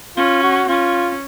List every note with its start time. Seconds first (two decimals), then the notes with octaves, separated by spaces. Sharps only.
0.17 C#4 F4
0.43 F#4
0.68 C#4 F4